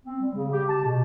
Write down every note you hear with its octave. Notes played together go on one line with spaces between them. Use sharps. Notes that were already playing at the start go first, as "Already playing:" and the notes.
C4
G3
C#3
G4
A5
B2